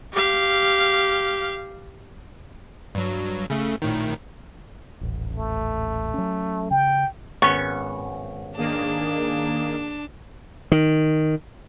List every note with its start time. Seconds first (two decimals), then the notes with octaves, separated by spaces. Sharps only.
0.13 G4 F5
2.95 G2 F#3
3.50 C#3 A3
3.82 A#1 A2 D#3
5.01 D#1 A1
5.36 A3
6.14 F#3 C#4
6.71 C#3 G5
7.42 G#1 B3 C#4 C#6
8.57 D#3 A#3 D4 G#4 A5
10.72 D#3